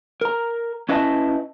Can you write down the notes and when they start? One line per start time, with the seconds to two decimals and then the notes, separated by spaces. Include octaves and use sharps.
0.21 A#4 A#5
0.89 C#4 E4 B4 D#5 E5 A5